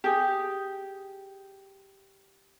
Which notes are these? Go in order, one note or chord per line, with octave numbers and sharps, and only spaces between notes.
G4 G#4